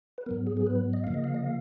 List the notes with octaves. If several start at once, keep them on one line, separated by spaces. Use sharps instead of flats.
B4
G#2 F#3 B3 A#4
G#4
G#4
B4
D#5
C#3 F3 A#3 F5
D#5
F5
D#5
F5